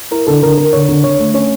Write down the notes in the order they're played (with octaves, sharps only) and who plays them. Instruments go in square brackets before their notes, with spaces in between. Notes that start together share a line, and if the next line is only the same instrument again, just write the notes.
[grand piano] E4 [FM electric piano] A#4
[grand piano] D3 [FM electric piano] A4
[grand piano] D3 [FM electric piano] A#4
[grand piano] D3 [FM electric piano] A#4
[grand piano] D3 [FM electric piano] C#5
[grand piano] D3
[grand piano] D3 [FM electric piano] C#5
[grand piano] A3
[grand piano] C#4 [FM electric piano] C#5